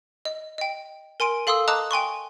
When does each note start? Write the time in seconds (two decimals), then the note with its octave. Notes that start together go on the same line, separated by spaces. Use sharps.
0.25 D#5
0.58 D#5 G5
1.20 A#4 G#5 C6 D7
1.47 A4 F5 C6 D#6 E6
1.68 D#5 A5 A#5 D6 D#6 F#6
1.91 G5 G#5 C6 C#6